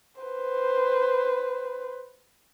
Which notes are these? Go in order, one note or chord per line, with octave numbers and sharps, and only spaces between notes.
B4 C5